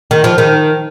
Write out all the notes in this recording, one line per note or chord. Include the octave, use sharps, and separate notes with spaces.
D#3
F3
D#3